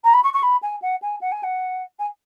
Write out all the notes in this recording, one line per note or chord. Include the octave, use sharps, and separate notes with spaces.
A#5
B5
C#6
C#6
B5
G#5
F#5
G#5
F#5
G#5
F#5
G#5